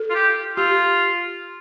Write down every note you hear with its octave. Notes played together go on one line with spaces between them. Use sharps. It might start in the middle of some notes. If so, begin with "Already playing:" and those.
Already playing: A4
F4
G4
F4 G4